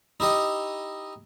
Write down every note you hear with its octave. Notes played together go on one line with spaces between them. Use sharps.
D#4 E4 G4 D#5